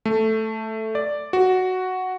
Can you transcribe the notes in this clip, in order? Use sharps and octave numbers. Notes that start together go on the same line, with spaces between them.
A3
D5
F#4